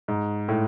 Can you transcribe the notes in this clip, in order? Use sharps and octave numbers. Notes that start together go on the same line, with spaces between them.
G#2
A2